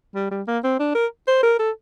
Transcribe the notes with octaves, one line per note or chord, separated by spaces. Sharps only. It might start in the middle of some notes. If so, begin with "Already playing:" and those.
G3
G3
A#3
C4
D4
A#4
C5
A#4
A4